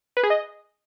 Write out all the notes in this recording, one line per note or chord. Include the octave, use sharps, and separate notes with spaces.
B4
G#4
D#5